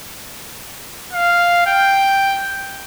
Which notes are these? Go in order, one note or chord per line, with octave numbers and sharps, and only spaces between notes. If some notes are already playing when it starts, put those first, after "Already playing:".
F5
G5